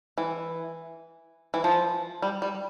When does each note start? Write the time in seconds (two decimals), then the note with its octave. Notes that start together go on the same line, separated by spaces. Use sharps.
0.18 E3
1.54 E3
1.64 F3
2.22 G3
2.42 G3